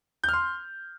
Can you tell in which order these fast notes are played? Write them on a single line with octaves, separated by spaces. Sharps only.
G6 F6 C6